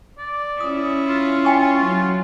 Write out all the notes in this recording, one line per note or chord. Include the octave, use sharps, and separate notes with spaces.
D5
C#4 E4 D#6
F4
G5 G#5 C#6
F#3